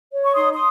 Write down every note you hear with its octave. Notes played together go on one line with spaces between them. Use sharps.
C#5
C#6
D#4 C6 D#6
C6 D#6